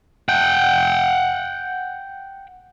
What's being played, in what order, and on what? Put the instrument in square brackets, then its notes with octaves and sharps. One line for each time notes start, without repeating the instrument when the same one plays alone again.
[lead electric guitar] F#5 G5